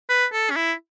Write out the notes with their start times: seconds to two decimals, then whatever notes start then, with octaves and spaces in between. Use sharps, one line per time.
0.10 B4
0.33 A4
0.50 C#4
0.56 E4